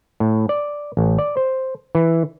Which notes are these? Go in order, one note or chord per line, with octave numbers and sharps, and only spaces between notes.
A2
D5
A1
D5
C5
E3